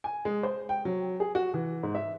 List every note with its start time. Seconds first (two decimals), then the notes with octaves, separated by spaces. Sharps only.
0.04 G#5
0.25 G#3
0.43 C5
0.69 G5
0.85 F#3
1.20 G#4
1.35 F#4
1.54 E3
1.83 G#2
1.95 E5